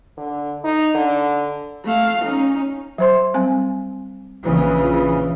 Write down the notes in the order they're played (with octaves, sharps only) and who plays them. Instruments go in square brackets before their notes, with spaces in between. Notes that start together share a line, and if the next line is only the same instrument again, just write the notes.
[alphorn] D3
D#4
D3
[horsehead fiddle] A3 F5
C#4 D#4
[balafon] F#3 C5 C6
G3 C4 G#5
[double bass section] A#1 C#3 E3
[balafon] F4